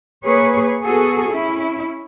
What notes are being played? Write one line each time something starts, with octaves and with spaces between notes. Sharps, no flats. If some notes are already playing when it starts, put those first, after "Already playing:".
A#3 G#4 B4 C#5
B3 F#4 G#4 A4
C#4 E4